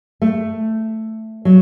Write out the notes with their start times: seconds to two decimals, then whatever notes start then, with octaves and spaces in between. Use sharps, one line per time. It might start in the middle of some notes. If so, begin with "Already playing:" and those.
0.22 A3
1.45 F#3